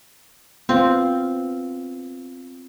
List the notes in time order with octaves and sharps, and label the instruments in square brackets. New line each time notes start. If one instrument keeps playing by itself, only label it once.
[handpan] B3 F4 F5 [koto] C4